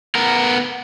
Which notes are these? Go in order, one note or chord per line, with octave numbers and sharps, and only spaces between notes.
B3 A#4